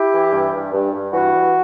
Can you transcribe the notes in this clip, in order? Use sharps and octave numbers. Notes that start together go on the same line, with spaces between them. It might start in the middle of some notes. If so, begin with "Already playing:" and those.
Already playing: E4 G4
E3
G2
G2
G2
G2
E3 F#4
G2